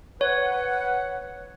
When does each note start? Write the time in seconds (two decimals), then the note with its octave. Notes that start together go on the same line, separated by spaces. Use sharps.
0.21 B4 C#5 F#5